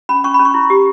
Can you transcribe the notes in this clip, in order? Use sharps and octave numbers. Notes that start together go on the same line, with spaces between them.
C#4 B5
C#4 C#6
B5
C#4
C#6
E4
G4